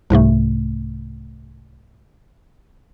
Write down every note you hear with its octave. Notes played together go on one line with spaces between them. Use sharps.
C2 G#2 C3 A3